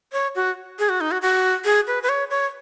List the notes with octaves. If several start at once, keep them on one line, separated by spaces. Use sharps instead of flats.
C#5
F#4
G#4
F#4
D#4
F#4
F#4
G#4
B4
B4
C#5
C#5